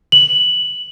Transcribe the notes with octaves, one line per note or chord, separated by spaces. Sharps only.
F#7